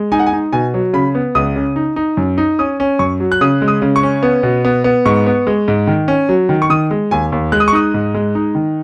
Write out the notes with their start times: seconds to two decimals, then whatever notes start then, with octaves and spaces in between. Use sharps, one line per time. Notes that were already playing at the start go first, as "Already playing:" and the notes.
Already playing: G#3
0.12 D#4 G#5
0.19 F#5
0.26 G#5
0.33 D#4
0.53 B2 G#5
0.74 F#3
0.93 C#3 B5
1.15 B3
1.35 C#2 D#6
1.56 C#3
1.76 D#4
1.96 D#4
2.17 F#2
2.38 D#4
2.59 C#4 D#6
2.80 C#4
2.99 F#2 C#6
3.20 F#3
3.32 F#6
3.41 C#3 D#6
3.62 G#3
3.68 D#6
3.82 C#3
3.96 C#6
4.03 C#4
4.23 B3
4.43 B2
4.65 B3
4.84 B3
5.05 G#2 C#6
5.26 B3
5.47 G#3
5.68 G#2
5.87 D#3
6.08 C#4
6.29 F#3
6.49 D#3
6.62 C#6
6.70 D#3 D#6
6.91 G#3
7.11 D#2 G#5
7.32 D#2
7.52 G#3 F#6
7.60 D#6
7.68 C#6
7.73 D#4 D#6
7.94 G#2
8.14 G#3
8.35 D#4
8.55 D#3